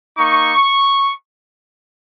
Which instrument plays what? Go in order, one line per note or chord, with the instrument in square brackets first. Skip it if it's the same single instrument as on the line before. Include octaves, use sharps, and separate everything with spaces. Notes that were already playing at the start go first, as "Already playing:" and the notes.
[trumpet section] A#3 D#4 C#6